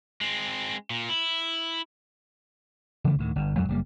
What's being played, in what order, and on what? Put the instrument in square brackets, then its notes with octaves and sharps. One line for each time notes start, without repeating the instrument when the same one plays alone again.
[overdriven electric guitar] G#3 C4
A#2
E4
[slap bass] C#3 E3 F3 A3
D2 A2 D#3
G1 G2
F2 F#3 G#3
F#1 G3 A#3